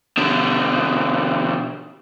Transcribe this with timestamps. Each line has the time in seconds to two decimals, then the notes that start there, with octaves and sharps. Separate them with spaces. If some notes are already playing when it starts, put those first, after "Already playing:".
0.17 B2 D3